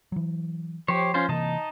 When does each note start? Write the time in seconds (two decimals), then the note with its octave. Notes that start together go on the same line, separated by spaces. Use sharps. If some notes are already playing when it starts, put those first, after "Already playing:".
0.12 E3 F#3
0.88 F3 G4 C5 C#5
1.14 C#4 F4 C5
1.29 C3 E3 A#3 D#4 D#5 A5